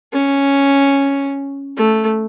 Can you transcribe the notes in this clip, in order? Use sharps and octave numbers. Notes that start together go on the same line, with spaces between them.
C#4
A3